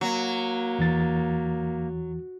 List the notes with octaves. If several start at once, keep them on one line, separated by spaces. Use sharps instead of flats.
F#3 A#3
E2 E3 A6